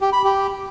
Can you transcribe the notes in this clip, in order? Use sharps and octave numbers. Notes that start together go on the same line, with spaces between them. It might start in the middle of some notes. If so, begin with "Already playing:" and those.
G4
B5
G4